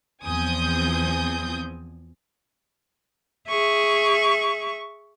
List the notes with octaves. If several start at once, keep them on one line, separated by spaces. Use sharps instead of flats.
E2 F3 C4 G#5 D#6 G6
G#4 E5 C#6